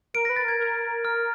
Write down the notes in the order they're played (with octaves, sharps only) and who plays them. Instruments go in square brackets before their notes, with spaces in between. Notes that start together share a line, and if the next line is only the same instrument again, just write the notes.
[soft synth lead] A#4 [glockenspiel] D7
[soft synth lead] B4 [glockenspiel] A#6
[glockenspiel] A6
[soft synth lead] A#4 [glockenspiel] G#6
[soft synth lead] A#4
[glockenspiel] F6